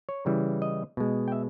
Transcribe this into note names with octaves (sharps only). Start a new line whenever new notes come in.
C#5
C#3 E3 G3
D#5
B2 G#3
G5
E5